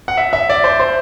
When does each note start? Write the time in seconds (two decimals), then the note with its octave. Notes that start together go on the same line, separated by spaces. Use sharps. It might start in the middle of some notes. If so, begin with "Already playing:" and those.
0.08 F#5
0.17 E5
0.33 E5
0.49 D5
0.64 C5
0.80 C5